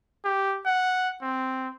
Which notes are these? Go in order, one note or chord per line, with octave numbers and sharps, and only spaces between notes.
G4
F#5
C4